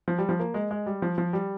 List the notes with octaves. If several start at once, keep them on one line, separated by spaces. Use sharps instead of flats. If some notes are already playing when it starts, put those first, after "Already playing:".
F3
G3
F3
A#3
G#3
G#3
G3
F3
F3
G3